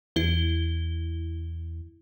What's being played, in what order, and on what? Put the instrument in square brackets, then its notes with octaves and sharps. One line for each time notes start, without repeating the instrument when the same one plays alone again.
[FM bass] E2 [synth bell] E4 G7